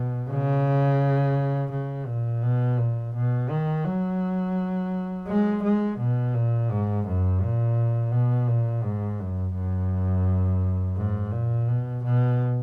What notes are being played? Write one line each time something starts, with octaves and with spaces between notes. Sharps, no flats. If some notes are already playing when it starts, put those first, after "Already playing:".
Already playing: B2
C#3
C#3
A#2
B2
A#2
B2
D#3
F#3
G#3
G#3
B2
A#2
G#2
F#2
A#2
B2
A#2
G#2
F#2
F#2
G#2
A#2
B2
B2